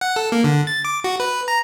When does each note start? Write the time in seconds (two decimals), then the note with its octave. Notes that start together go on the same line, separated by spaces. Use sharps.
0.01 F#5
0.16 A4
0.32 A#3
0.44 D3
0.67 A6
0.85 D6
1.04 F#4
1.20 B4
1.48 A#5